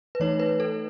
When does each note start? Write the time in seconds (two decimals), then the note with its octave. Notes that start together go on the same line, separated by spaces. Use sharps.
0.15 B4
0.20 E3 A3 D#4 C#5
0.40 B4
0.60 A4